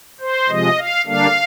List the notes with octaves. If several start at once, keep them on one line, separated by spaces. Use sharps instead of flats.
C5
C3 F3 G#3 D#5
F5
D3 G3 A#3 D4 F5